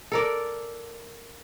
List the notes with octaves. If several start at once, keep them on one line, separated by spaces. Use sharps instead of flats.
A4 A#4 D5